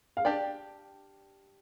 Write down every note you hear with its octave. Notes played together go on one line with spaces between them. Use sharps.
F5
D4 G4 D5 G5